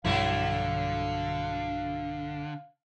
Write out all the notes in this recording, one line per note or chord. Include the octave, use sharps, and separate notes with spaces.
B1 G2 D3 F3 F#3 A3 E4 F5